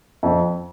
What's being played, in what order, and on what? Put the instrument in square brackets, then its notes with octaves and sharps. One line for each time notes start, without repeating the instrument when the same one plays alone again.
[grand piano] F2